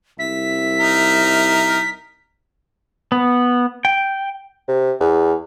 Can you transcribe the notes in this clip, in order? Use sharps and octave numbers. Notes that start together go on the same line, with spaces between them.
C2 E5 B6
D#4 A#4
B3
G5
C3
E2